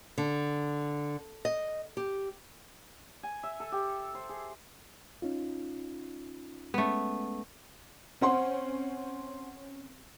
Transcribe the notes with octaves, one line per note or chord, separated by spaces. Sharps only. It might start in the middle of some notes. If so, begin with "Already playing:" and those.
D3
D#5
G4
G#5
E5
A4
G4
C5
G#4
C#4 D#4 F4
G#3 A3 B3 C#4
C4 C#4 C5 F#5 C6